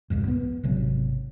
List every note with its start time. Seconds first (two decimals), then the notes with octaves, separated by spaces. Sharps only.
0.10 F#1 C2 F2 G#2
0.28 B3
0.64 G#1 C3 F#3